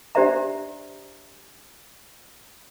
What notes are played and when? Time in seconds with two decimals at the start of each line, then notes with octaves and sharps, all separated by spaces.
0.15 D4 G4 C5 D5 E5 A#5